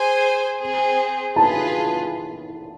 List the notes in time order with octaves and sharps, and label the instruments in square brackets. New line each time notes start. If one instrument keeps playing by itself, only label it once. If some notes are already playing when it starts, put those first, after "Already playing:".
Already playing: [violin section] G#4 C5 G#5
C4 G#4 C5
[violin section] F4 G#4 B4 [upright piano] A5